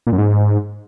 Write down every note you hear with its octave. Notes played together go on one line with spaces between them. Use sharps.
A#2
F#2
G#2